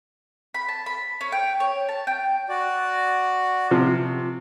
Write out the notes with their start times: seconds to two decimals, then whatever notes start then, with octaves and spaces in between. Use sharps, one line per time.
0.54 B5
0.68 A5
0.86 B5
1.21 C#4
1.32 G5
1.60 C#5
1.89 A5
2.07 G5
2.49 F#4 D5
3.71 C3 F3